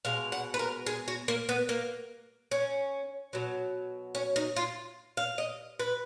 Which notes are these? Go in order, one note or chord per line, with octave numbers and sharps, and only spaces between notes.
B2 G#3 F5
F#5
B4
A#4
G#4
F#4
A#3
B3
A#3
C#4
B2 F#3
C#4
D#4
F4
F5
D#5
B4